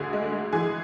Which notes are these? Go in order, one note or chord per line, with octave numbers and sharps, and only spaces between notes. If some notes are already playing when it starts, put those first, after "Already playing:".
Already playing: D2 D3 G#4
G#3
G#3
E3 G#4